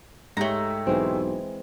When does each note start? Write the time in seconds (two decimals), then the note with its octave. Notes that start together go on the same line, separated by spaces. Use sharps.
0.37 G#2 A3 G4 C#5 F#5 A#5
0.87 B1 E3 G#3 C4